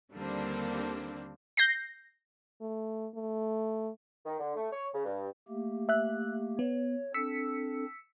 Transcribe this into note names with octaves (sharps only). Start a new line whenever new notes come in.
D#2 D3 G3 A#3 C4 D4
G6 A#6 C7
A3
A3
D#3
D3
A3
C#5
C#3
G2
A3 A#3 G4
E5 F#6
B3 C#5
C4 D4 A4 E6 B6 C#7